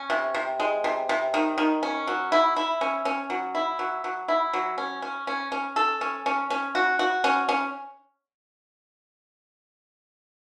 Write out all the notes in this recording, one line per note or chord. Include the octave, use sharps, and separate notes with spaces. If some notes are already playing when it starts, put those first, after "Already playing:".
Already playing: C#4
C3
C3
G#3
C3
C3
D#3
D#3
C#4
F#3
E4
E4
C#4
C#4
F#3
E4
F#3
F#3
E4
F#3
C#4
C#4
C#4
C#4
A4
C#4
C#4
C#4
F#4
F#4
C#4
C#4